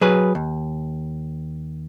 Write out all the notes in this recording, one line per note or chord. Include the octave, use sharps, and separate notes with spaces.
F#3 G#4 B4
D#2